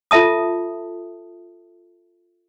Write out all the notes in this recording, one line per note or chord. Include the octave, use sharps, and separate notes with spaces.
F4 A4 E5 A5 D#6